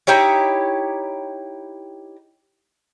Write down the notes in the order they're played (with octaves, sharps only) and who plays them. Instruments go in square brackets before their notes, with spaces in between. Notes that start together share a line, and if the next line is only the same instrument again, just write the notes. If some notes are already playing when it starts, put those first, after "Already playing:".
[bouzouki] D#4 E4 G4 C#5